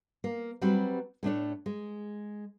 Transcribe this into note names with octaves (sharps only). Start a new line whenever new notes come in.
A#3
F#3 G3 C4 F#4 G4 B4
A2 A3 D4 C#5
G#3